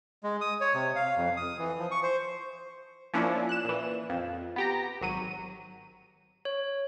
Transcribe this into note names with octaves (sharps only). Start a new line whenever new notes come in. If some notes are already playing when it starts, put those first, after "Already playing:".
G#3
D#6
C#5
C3
F5
F2
D#6
E3
F3
C#6
C5
F3 A#3 C#4 D4 E4
F#6 E7
A#2 E3
F2
B3 G4 A#5
G#1 F#3 D#7
C#5